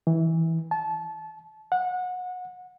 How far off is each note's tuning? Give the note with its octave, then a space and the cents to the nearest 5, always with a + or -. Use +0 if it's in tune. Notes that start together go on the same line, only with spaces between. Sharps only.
E3 -15
A5 -25
F#5 -25